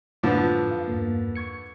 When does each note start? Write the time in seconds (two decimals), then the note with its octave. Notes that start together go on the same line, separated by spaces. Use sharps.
0.23 F#2 A2 D3 F3 B3
0.71 F5
0.87 E2 G2 A#3
1.36 C#6 G#6 C#7